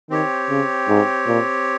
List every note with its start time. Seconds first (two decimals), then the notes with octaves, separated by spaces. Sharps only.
0.10 D#3 C4 G4 C#5
0.50 C#3
0.89 G#2
1.27 A#2